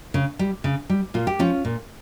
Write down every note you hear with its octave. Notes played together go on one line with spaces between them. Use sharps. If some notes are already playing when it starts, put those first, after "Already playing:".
C#3
G3
C#3
G3
A#2 F4
G4
F3 C#4 F4
A#2